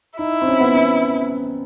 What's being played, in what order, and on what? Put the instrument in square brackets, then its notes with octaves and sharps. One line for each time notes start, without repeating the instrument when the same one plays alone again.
[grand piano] D#4 [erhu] E4
[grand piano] C4
C#4
B3
C#4